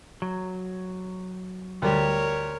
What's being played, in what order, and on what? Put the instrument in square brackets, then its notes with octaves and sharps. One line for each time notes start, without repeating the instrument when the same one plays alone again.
[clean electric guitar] F#3
[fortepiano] D2 G3 [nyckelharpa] A#4 C#5